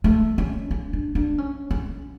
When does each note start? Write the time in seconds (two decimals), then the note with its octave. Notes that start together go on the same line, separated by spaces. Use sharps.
0.04 A3
0.38 C#4
0.71 C#4
0.93 D4
1.15 D4
1.38 C#4
1.71 C#4